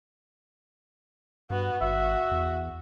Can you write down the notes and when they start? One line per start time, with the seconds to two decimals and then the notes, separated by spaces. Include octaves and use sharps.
1.50 G2 B3 F#4
1.81 G#1 F#4 E5
2.31 E2